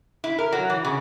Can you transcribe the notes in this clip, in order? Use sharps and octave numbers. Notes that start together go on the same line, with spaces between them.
E4
A#4
F#3
E3
C#3